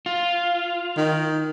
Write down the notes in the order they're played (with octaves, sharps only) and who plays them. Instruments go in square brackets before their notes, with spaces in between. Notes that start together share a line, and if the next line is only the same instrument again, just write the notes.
[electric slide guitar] F4
[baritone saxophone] D#3